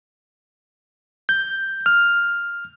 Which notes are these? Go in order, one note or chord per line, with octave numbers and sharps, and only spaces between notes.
G6
F6